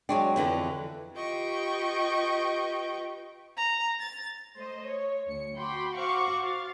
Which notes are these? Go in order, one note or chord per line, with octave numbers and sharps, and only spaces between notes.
F#3 G#3 D4 G5 C6 C#6
F2 D3 E3
F4 G4 B4 D#5 G5 C#6
A#5
A6
A3 C5 D#5
C#5
D2 C#7
F#4 G5 B5 C6 D6
F#4 C5 F5 F#5 C#6 D6
F5 A6